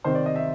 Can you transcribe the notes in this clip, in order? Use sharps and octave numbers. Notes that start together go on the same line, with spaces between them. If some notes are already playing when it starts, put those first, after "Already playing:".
C3 D#3 C5
D5
D#5
E5